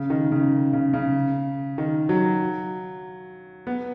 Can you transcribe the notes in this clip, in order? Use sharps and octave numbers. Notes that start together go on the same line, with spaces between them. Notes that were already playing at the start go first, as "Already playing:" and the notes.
Already playing: C#3
D#3
C#3
C#3
C#3
D#3
F#3
B3